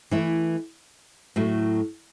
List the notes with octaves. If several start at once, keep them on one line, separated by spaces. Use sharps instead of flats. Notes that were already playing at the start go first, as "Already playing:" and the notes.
E3 A3 E4
A2 F#3 A3